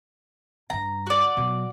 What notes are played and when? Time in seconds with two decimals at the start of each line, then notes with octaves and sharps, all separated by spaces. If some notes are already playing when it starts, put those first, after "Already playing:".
0.70 G2 C#3 A#5
1.07 F#4 D5
1.37 B2 F#3